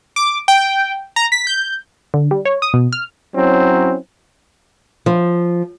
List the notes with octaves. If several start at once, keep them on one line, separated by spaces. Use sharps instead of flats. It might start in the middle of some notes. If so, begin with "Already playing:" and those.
D6
G5
A#5
B6
G6
D3
G3
C#5
D#6
B2
F6
F#3 C4 C#4 E4
F3